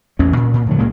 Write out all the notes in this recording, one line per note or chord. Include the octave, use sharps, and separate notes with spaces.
A1 E2 E3 C#4
A#2
A#2
A2 D3 F3 F#3
C#2 A#2 G#3 A#3